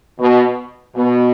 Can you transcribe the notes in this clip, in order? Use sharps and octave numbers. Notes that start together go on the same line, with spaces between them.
B2
B2